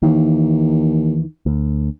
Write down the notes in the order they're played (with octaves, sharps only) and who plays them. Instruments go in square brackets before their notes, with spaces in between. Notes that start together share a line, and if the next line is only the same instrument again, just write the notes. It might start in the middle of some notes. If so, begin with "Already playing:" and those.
[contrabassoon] D#2 [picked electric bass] D#3 E3
[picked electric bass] D2